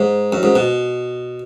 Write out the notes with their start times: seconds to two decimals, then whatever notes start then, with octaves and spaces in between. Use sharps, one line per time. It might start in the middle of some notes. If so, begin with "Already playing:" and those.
Already playing: G#2
0.33 F#2
0.43 G#2
0.56 B2